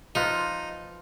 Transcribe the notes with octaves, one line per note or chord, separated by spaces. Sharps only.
F3 D#4 F4 B4